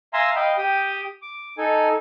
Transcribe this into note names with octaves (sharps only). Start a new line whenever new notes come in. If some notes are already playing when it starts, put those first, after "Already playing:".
E5 F5 G#5 A#5 C6 E6
D#5 F5 G5 B5
G4 G5 D#6
D6
D#4 A4 G#5